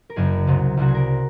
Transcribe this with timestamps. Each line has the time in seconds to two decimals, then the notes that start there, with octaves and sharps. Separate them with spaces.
0.10 A#4
0.16 F#1 F#2 C#3 G#4
0.47 C2 C3 F#3
0.77 C2 C3 F#3 F#4
0.88 G#4
0.95 A#4